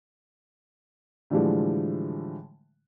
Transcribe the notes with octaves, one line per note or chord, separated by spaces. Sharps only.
A2 D3 E3 F3 G3 G#3